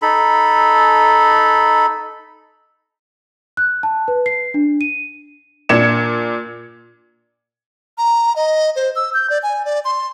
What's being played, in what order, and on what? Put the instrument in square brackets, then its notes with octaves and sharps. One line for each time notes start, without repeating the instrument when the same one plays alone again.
[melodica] D#4 A4 B5
[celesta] F#6
A5
B4
C7
D4
D#7
[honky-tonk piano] A#2 D4 G#6 C#7 E7
[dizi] A#5
D#5
C5
E6
G6
D5
G#5
D5
C6